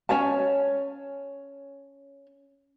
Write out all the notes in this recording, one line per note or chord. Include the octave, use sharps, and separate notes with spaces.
C#4 C#5 G#5 A5